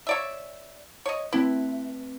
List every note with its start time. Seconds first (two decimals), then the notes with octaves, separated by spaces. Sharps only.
0.07 C#5 D5 E5
1.06 C#5 D#5
1.33 A3 C4 E4 B4